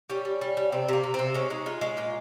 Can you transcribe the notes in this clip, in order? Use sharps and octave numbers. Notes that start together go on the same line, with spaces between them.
G3 C#4
G3
G3
G3
C3 C4
C3 A#3
C3
C3 C4
G#3 C#4
G#3 D#4
G#3 F4
G#3 C#4
A#2 F4